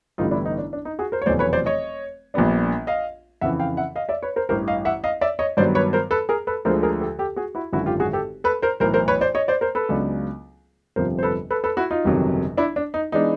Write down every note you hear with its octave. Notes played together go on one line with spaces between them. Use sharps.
A1 G2 D3 G3 B3 D#4 F4
D4 E4
D#4
D4
D4
D#4
F#4 G#4
A#4 C5
C#5
F1 E2 B2 F#3 A3 C5 D5
B4 C#5
C5 D5
C#5 D#5
A#1 A#2 G3 B3 D4
D#5 F5
F2 C#3 E3 E5 F#5
F5 G5
E5 F#5
D#5 F5
D5 E5
B4 C#5
A#4 C5
A1 G2 E3 A#4 C5
D#5 F5
E5 F#5
D#5 F5
D5 E5
C#5 D#5
G2 D#3 F#3 B3 C5 D5
B4 C#5
A#4 C5
A4 B4
G#4 A#4
A4 B4
D2 D3 F3 G#3 A#4 C5
G#4 A#4
G4 A4
G4 A4
F#4 G#4
E4 F#4
G#1 F#2 D3 E4 F#4
F4 G4
F#4 G#4
G4 A4
A4 B4
A#4 C5
B1 A2 E3 A#4 C5
A#4 C5
B4 C#5
C5 D5
C#5 D#5
C5 D5
A#4 C5
A4 B4
C#2 C#3 F#3 B3 D4
G1 F2 C3 F3 A#4 C5
C5
A4 B4
A4 B4
A4 B4
E4 F#4
D#4 F4
G1 F2 C3 D#3 F#3
D4 E4
D4
D#4
E3 G#3 B3 D4 D#4